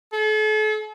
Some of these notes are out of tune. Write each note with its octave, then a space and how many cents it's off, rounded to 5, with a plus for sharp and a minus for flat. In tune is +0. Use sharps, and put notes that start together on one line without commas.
A4 -40